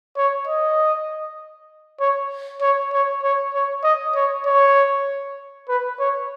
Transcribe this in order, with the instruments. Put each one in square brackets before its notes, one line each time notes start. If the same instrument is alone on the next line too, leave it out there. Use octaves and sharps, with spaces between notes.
[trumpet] C#5
D#5
C#5
C#5
C#5
C#5
C#5
D#5
C#5
C#5
B4
C#5